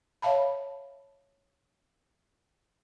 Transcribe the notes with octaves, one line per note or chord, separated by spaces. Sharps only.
C#5 E5 F5 A5 B5